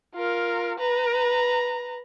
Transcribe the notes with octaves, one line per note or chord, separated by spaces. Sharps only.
F4 A#4
B4 A#5